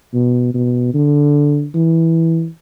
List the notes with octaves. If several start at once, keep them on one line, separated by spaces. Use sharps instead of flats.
B2
B2
D3
E3